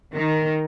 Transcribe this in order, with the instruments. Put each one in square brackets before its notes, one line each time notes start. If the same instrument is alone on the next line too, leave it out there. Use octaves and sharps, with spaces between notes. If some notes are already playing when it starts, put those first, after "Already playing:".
[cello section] D#3